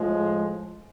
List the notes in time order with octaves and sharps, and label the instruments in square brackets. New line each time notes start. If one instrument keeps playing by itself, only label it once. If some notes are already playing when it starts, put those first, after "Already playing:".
Already playing: [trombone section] A2 F3 G#3